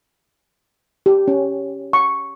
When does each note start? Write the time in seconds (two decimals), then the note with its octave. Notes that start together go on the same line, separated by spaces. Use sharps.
1.06 G4
1.28 C#4
1.93 C#6